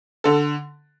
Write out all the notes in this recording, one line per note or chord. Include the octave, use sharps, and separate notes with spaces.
D3 A4